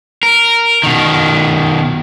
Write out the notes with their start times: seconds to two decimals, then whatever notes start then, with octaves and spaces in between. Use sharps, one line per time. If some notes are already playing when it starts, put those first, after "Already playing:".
0.23 A#4
0.83 B2 D#3